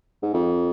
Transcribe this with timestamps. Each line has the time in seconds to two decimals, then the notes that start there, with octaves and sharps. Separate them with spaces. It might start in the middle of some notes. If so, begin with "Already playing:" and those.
0.23 G#2
0.34 F2